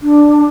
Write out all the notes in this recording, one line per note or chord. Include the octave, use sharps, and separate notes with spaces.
D4